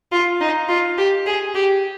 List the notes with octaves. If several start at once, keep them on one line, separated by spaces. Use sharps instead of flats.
F4
D#4
F4
G4
G#4
G4